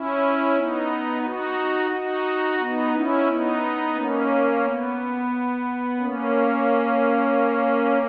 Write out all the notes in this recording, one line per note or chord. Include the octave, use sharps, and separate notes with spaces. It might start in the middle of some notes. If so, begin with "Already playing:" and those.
Already playing: C#4 E4
B3 D#4
D#4 F#4
D#4 F#4
B3 D#4
C#4 E4
B3 D#4
A#3 C#4
B3
A#3 C#4